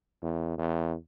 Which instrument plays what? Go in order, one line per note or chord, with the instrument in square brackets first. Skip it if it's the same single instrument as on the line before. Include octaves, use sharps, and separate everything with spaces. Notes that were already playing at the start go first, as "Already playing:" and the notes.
[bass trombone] E2
E2